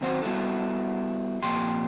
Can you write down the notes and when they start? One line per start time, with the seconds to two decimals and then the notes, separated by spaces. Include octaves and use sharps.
0.01 F#2 D#3 C4 F#4 C5
0.22 G3 B3 E4 F#4 A4
1.42 F2 A#2 G4 C6